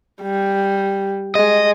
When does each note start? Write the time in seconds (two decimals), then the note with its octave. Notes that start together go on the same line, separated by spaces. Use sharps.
0.22 G3
1.35 G#3 D#5